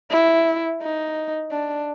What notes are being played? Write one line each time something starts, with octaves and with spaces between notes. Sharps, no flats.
E4
D#4
D4